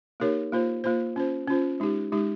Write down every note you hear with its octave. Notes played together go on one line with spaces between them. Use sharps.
A#3 D#4 G4 A#4 C#5
A#3 F4 C5
A#3 F4 C5
C#4 F4 C5
C#4 F4 C5
G#3 D#4 G4
G#3 D#4 G4